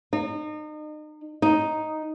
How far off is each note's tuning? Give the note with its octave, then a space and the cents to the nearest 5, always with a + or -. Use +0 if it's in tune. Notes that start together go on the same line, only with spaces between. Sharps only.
D#4 -35
D#4 +0